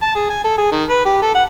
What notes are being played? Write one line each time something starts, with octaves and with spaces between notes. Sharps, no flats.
A5
G#4
G#5
A4
G#4
D#3
B4
G4
A4
F#5